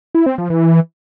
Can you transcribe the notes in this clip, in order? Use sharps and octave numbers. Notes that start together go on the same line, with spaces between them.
E4
C4
F3
E3